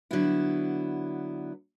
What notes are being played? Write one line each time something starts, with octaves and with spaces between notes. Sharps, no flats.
D3 F#3 B3 E4